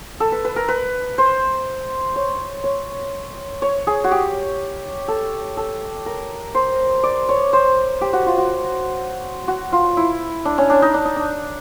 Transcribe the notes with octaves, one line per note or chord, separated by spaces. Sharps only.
A4
B4
B4
A#4
B4
C5
C#5
C#5
C#5
G#4
F#4
G4
A4
A4
A#4
C5
D5
C#5
C5
G4
F#4
F4
F#4
F#4
F4
E4
D4
C#4
D4
D#4
D4
D#4
D4